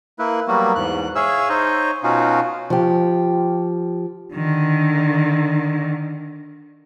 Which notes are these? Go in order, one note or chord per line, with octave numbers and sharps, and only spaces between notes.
A#3 E4 B4
F#3 G3 A#3 B3 F#4
E2 G#2 F#6
G#4 C#5 E5 F5 E6
D#4 C5 C#5 D#5
B2 C#4 D#4 F4 F#4
F3 G4
D3 D#3